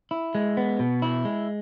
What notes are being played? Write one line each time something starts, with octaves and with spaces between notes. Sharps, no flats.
E4
G#3
B3
B2
E4
G#3